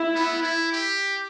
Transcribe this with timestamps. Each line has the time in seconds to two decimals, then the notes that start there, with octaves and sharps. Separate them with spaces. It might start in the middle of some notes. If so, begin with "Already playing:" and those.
Already playing: E4
0.15 B3
0.42 E4
0.72 G4